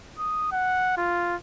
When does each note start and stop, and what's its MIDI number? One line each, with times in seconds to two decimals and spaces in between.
0.19 0.49 87
0.52 0.97 78
0.97 1.36 65